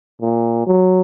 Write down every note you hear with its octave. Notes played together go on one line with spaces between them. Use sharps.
A#2
F#3